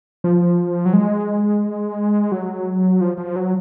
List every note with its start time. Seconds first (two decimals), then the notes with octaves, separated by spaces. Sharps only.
0.24 F3
0.85 F#3
0.93 G#3
2.32 F#3
3.01 F3
3.18 F3
3.36 F#3